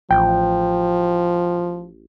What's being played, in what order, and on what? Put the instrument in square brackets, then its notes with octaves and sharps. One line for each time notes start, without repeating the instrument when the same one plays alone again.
[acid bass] A1 [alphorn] F3 [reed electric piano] G5